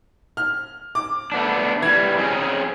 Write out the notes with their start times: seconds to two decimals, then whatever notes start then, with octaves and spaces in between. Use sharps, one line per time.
0.37 F6
0.95 D6
1.32 A3 B3 D4
1.82 E3 G3 G#6
2.18 C4 C#4 G#4